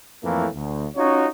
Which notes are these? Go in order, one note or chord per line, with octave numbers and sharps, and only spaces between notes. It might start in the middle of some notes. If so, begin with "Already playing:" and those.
F2 A2 E3 A3 A#3 F5
D2
C#4 D#4 F4 F#4 C#5